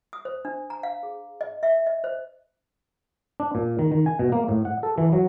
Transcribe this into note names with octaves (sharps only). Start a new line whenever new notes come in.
D#6
C5
D4
A#5
F5
G#4
D#5
E5
D#5
C5
D4
A#2
D#3
D#3
G#5
B2
A#3
A2
F#5
A4
E3
F#3